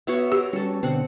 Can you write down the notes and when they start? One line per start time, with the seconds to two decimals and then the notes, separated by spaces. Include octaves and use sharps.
0.07 B3 F#4 C#5 E5
0.32 G4 A#4
0.53 G3 C#4 F#4 A4
0.83 B2 D3 C4 F#5